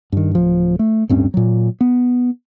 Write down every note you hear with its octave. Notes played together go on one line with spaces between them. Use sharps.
G2 D#3
D1 F3
A3
D1 G2 C4 C#4
A#2 F#3
B3